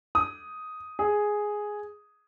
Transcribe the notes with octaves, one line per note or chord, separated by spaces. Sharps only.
D#6
G#4